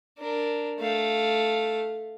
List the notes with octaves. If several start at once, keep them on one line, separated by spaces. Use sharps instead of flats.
D4 A#4
A3 F5